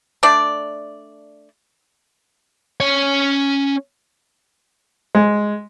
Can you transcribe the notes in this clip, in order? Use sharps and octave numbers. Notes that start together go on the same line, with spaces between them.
A3 D4 D5
C#4 C#5
G#3